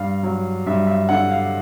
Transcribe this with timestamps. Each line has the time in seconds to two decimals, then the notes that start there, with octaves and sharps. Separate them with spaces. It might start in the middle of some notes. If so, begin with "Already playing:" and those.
Already playing: G2 F5
0.23 F#3
0.66 G2 E5
0.87 E5
1.09 D3 F#5
1.30 F5